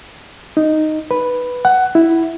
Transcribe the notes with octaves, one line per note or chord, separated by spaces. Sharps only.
D#4
B4
F#5
E4